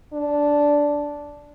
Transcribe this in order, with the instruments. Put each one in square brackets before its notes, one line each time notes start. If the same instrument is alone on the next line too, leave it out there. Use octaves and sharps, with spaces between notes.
[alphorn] D4